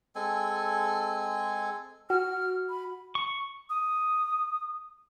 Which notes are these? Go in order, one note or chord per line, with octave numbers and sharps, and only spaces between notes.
G#3 C4 A4 G#5
F#4 F6
B5
C#6
D#6